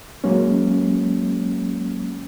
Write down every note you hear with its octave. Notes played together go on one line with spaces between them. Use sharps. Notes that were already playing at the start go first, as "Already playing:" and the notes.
F#3 G#3 A#3 C#4